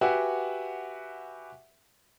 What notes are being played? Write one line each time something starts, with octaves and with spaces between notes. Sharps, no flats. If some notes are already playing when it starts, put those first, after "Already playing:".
F#4 G4 B4 E5 F#5 G#5